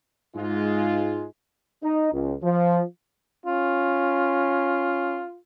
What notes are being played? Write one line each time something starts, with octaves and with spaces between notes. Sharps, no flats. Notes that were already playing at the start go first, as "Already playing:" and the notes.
G#2 G#3 F4
D#4
C#2
F3
C#4 F4